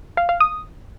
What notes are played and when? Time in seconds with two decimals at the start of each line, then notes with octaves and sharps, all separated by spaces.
0.17 F5
0.29 F5
0.40 D#6